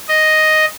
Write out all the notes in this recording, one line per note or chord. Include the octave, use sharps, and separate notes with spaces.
D#5